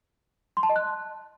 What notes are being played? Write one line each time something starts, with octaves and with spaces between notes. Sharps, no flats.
C6
A5
D#5
F#6